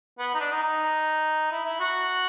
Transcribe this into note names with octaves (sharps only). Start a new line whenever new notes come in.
B3
D#4
D4
D#4
D#4
E4
E4
F#4